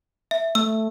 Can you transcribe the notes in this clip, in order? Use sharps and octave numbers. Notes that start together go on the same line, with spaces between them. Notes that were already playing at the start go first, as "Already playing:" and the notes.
E5
A3 E6